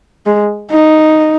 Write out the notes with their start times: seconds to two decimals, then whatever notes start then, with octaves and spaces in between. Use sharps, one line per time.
0.26 G#3
0.70 D#4